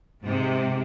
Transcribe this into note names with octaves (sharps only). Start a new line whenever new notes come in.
G#2 C3